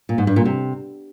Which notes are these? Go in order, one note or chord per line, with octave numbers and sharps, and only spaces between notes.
A#2
G#2
G2
A#2
C3